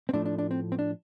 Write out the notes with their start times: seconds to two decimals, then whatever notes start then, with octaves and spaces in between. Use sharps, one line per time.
0.09 C4
0.13 A2 F3 A3 D4
0.26 D4
0.38 D4
0.51 C4
0.72 C4
0.79 D4